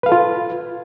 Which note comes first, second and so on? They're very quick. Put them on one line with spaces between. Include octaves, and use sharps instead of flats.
B4 F5 A4 F4